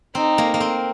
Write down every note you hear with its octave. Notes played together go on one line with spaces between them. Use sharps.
C4 D#4
A#3
A#3
C4